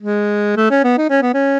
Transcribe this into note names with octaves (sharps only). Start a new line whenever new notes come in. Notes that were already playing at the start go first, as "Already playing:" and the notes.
G#3
A3
C#4
B3
D#4
C#4
B3
C#4